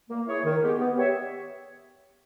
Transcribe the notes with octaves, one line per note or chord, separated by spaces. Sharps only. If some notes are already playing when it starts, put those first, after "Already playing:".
A#3
E4 G#4 C#5
D#3
G#3 B3 G4
B3
G4 C#5 E5